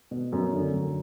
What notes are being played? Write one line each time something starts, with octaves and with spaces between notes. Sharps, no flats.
B2
F#2
D3
F#2